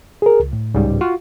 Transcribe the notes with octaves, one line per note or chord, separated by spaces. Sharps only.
G#4 A#4
C#2
A2
C#2 G#2 G3
F4 F#4